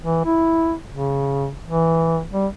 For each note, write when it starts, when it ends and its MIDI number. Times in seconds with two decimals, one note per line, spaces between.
0.02 0.25 52
0.25 0.76 64
0.91 1.50 49
1.65 2.23 52
2.33 2.47 55